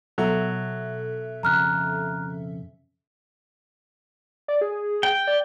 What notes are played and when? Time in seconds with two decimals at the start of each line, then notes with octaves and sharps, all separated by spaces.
0.18 B2 F#3 A4 E5
1.43 F2 C#3 A#5 F6 F#6
4.48 D5
4.61 G#4
5.03 G5
5.27 D5